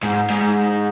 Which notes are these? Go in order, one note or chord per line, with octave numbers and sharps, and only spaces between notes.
G#2
G#2